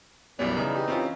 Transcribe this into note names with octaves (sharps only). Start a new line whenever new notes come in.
B1 F#2 E3 G3 B3 D5
C#3 E3 D#4
G4
C4 C#4 F4